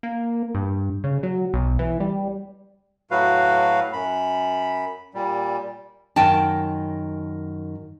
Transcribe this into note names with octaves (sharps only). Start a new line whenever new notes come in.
A#3
G2
C#3
F#3
B1
E3
G3
A2 F#3 F#4 B4 F5
F#2 B5
A#2 G3
F#2 D#3 G5 A5